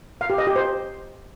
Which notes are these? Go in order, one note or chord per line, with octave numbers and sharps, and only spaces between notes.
F5
G4
D#5
G4
C5